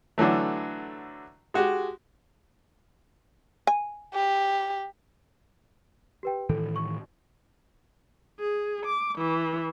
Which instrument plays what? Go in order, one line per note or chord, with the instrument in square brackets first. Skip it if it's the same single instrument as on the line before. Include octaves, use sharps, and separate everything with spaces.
[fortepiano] D3 E3 F#3 A3
G#3 F#4 G4
[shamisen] G#5
[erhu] G4
[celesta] G4 B4 G5
[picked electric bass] A2 D#3 E3 [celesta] A4
[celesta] C#6
[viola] G#4
D6
E3